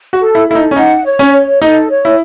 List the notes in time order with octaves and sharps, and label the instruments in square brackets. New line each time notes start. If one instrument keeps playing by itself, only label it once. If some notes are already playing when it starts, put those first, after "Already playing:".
[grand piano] F#4
[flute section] A4
[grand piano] E4
[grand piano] E4 [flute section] A4
[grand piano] D#4
C#4
[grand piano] D#4 [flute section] F#5
[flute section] C#5
[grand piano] C#4
[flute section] C#5
[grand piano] D#4 [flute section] A4
[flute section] C#5
[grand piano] E4